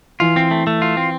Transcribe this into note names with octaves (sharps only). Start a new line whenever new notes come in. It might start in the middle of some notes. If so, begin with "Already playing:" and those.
E3 F4
C4
A3
A3
F4
C4